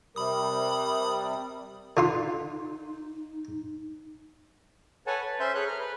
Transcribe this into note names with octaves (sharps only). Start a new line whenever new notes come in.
C3 G3 A#4 B5 D#6
D3 D#4 F4 C6
A4 B4 C#5 F#5 G#5 A5
B4
C#4 C5 E5 C6 G6
G#4 A4 B4 C#5 F#6
A#5 F6
B4 B5